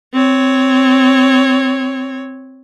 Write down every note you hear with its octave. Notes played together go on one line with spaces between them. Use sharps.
C4 C#5